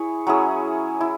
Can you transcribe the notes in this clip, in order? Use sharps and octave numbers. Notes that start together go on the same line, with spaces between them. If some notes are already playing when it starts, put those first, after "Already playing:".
Already playing: E4 G#4 C#5
F#3 C#4 E4 G#4
E4